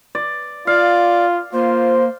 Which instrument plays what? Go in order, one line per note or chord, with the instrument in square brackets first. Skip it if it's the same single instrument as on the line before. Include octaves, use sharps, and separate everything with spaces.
[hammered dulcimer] D5
[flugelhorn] F4 [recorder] D5 [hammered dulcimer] F5
[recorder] A#3 [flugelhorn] F4 [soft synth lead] C5